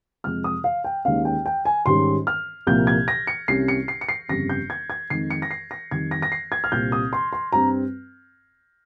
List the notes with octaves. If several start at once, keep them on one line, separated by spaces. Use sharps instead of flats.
F2 C3 F3 G#3 F6
D#6
F5
G5
D#2 D#3 G#3 C#4 F5
G5
G5
G#5
G#2 D#3 G3 C#4 C6
F6
C2 A#2 F3 A#3 G6
G#6
A#6
C#7
C2 C3 G3 C#4 C7
C#7
C7
C#7
C7
G1 F2 C#3 G3 A#6
G6
G#6
G#6
F2 D#3 G#3 C7
C#7
A#6
C7
A#6
F2 D#3 G3 G#6
A#6
A#6
C7
G#6
F6
C2 A#2 G3 C4 G6
D#6
C6
C6
G2 G3 C4 A#5